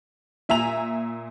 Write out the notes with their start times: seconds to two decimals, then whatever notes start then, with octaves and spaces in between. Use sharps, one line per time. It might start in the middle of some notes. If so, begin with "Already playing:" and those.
0.49 A#2 E5 G#5 A#5 F7